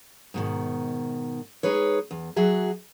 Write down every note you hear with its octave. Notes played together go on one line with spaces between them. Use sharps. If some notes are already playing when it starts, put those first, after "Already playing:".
G#2 B2 D#3
G#3 D#4 G#4 B4 C#5
E2
F#3 F#4 G#4 E5